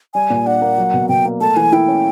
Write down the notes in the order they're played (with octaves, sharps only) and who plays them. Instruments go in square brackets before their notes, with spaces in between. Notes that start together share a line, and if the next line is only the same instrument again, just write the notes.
[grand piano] G3 [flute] G#5
[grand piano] A#2
[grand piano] D4 [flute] F#5
[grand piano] A#3
F#3
B2
[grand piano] B2 [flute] G5
[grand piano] A#3
[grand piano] A3 [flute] A5
[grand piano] E3 [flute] G#5
[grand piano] E4 [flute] G5
[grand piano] C#4